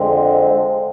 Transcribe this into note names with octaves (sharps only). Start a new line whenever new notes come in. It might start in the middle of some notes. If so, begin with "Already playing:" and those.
Already playing: F2 D3 F3 G#3 C4